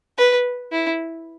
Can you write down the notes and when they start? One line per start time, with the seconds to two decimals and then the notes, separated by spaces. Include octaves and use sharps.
0.17 B4
0.72 E4